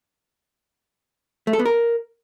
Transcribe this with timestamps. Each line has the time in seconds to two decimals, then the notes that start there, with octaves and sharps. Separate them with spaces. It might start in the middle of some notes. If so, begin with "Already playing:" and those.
1.47 A3
1.53 A4
1.59 B3
1.65 A#4